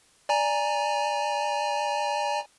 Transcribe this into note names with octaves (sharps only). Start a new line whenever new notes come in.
D5 G#5 A#5